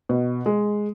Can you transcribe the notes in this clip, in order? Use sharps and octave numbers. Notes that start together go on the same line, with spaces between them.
B2
G#3